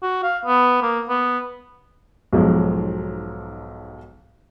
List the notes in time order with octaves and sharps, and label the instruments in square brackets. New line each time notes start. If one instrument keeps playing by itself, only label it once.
[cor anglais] F#4
F5
B3
A#3
B3
[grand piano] B1 G#2 B2 F3 F#3 G#3